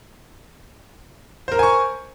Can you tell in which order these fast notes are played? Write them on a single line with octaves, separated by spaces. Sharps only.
C5 A#4 A#5 G#5 C#6